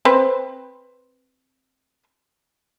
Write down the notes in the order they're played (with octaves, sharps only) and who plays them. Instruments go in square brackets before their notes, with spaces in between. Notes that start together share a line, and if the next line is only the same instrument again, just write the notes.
[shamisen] C4 B4 C5